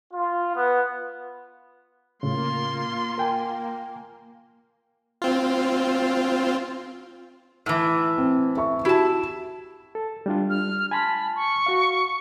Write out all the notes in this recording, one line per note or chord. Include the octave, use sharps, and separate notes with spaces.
F4
B3
A2 C#3 A#3 F4 C6
A#4 G5 G#5
C4 F4
A2 E3
C4
E5 C#6
E4 F#4 G4 A5
A4
G3 D4 F4
F6
G#5 A5 B5 C6
C#6
F#4 F5